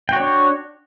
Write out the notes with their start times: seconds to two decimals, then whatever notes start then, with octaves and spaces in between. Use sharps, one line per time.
0.09 G5
0.13 F#4
0.16 C#5
0.20 D4